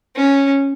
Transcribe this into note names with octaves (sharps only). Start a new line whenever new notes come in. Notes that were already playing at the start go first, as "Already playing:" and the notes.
C#4